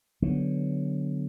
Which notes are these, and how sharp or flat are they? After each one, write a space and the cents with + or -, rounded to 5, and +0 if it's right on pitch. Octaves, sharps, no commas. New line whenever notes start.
D3 +0 F#3 +0 B3 +0